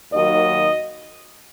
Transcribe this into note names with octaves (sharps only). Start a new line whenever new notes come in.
D#2 D#3 F#3 D#5